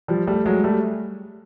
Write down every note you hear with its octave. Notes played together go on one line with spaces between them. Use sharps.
F3 G3
G3 A3
F#3 G#3
G3 A3